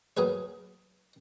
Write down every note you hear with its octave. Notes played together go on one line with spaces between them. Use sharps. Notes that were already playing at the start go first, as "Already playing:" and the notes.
F#3 G#4 A#4 B4 C#5